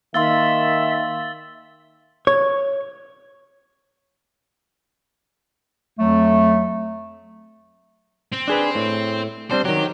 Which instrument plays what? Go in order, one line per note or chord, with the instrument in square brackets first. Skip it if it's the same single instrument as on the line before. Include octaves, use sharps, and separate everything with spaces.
[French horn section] D#3 [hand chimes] A#3 F5 C6 [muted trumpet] E5 [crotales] E6 A6 G7
[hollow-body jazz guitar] C#5
[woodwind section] F2 F#3 A3
[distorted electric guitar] C4
[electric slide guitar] D4 G#4 B4
A2
[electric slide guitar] G3 C4 D4 [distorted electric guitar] C5
[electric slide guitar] D#3 F#3 [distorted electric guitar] G4